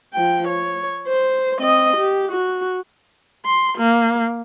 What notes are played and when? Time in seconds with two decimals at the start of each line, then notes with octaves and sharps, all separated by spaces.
0.14 F3 G5
0.48 C#5
1.07 C5
1.60 C4 D#5
1.97 G4
2.31 F#4
3.46 C6
3.78 A#3